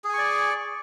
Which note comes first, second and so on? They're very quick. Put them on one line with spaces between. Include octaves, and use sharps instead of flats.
G#4 G#5 C#6 D5